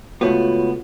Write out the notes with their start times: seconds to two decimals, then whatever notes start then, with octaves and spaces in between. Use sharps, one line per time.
0.21 C#2 A3 B3 F4 F#4 C#5